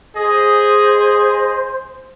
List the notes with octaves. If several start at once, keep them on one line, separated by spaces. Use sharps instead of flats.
G#4 C5 D#5